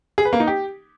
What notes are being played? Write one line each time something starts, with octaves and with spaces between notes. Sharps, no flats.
G#4
B4
A#3
D#4
G4